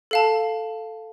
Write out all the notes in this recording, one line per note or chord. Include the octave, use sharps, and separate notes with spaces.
A4 F5 A5